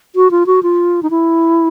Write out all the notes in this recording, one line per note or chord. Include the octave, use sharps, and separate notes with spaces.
F#4
F4
F#4
F4
D#4
E4